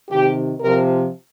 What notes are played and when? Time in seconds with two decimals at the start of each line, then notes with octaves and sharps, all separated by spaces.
0.08 C3 D#3 G4
0.61 C3 F3 A#4